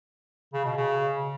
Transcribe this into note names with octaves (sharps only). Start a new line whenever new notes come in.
C#3
B2
C#3